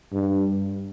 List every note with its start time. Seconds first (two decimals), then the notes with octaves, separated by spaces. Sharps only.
0.13 G2